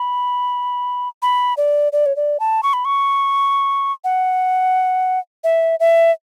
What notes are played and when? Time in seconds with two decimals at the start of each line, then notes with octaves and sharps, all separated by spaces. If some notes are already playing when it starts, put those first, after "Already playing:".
Already playing: B5
1.22 B5
1.57 D5
1.93 D5
2.06 C#5
2.16 D5
2.40 A5
2.63 C#6
2.73 B5
2.85 C#6
4.04 F#5
5.44 E5
5.80 E5